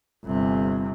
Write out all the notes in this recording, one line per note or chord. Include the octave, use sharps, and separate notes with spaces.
G1 C3